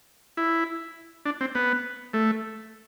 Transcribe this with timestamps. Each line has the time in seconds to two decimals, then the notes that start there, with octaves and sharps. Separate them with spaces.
0.37 E4
1.26 D4
1.41 C4
1.55 B3
2.13 A3